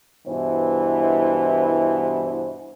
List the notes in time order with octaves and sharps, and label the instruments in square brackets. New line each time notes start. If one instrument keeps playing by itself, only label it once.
[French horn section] G2 B2 E3 E4 C5